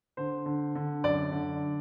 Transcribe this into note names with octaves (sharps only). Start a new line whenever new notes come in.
D3 C5
D3
D3
F#2 D5
D3